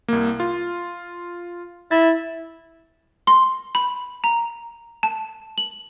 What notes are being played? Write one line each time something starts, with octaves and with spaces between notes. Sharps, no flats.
C2 A#3
F4
E4 A6
C6
B5
A#5
A5
F#7